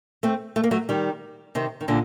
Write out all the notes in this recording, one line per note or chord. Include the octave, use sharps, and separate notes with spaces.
A3 C4
A3
A#3
F#3 A3
D#3 G3
C3 D#3
D#3
A#2 D3